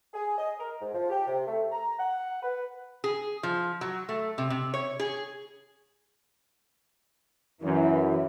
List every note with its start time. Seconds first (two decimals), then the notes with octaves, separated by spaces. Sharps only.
0.14 G#4
0.38 D#5
0.59 A#4
0.81 G#2
0.94 F3
1.10 G4
1.27 C3
1.47 A3
1.72 A#5
1.99 F#5
2.43 B4
3.04 G#4
3.43 F3
3.81 F#3
4.09 A3
4.38 C3
4.50 C3
4.74 C#5
4.99 G#4
7.63 F#2 E3